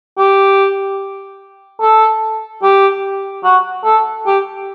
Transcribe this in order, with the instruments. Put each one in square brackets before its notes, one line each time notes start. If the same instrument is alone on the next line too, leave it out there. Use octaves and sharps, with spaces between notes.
[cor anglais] G4
A4
G4
F#4
A4
G4